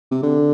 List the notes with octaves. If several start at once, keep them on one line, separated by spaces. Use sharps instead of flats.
C3
D3